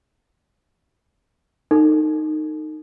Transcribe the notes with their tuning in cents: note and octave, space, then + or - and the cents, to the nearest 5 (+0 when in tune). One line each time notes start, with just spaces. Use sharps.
D#4 -10 A4 +35